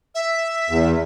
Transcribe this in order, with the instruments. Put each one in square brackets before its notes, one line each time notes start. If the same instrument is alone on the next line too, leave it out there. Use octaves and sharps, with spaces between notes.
[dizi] E5
[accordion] E2